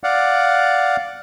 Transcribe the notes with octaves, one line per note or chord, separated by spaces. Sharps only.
D5 F5 F#5